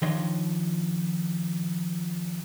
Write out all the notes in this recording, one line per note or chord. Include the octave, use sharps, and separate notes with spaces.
D#3 F3 D4 C#5 D#5 C6